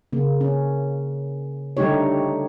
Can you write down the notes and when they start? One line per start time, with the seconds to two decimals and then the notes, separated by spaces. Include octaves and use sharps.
0.13 C#3 A#3
0.41 C#4
1.77 D3 G3 A3 D#4 G4 C#5